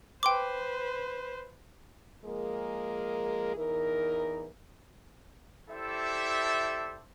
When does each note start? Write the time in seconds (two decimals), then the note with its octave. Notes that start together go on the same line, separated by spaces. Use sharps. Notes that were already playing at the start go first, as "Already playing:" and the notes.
0.23 B4 C5 G5 C6 D6
2.25 F3 G#3 A#3 G#4 A#4
3.56 E2 E3 D#4 A#4
5.70 E4 G4 A4 C5 D5 E5